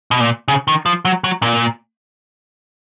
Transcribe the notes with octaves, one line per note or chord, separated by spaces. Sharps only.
B2
A#2
C#3
D#3
F3
F#3
F#3
A#2